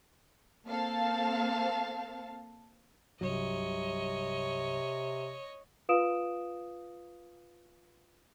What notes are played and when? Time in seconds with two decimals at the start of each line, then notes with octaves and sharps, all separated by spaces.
0.66 A#3 C4 A4 F5 A5
3.21 C2 G2 C3 F#3 C#5 D#5
5.89 F4 B4 F5 D#6 D7 E7